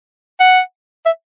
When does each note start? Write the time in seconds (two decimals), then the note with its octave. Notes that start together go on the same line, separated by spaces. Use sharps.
0.40 F#5
1.06 E5